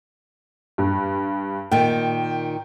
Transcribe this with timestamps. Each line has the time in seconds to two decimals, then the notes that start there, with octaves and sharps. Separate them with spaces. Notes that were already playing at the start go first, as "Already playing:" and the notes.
0.78 G2
1.72 A#2 D#3 G5